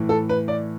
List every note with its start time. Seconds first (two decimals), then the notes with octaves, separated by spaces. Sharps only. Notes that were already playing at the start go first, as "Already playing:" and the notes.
Already playing: A2 E3
0.09 A4
0.29 B4
0.48 D5